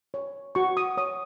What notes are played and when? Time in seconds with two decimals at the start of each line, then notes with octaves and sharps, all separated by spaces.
0.14 C#5
0.55 F#4 C#6
0.77 D#6
0.97 C#5 D#6